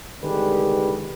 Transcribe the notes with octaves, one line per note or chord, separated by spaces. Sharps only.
C2 D3 D#3 G#3 G4 B4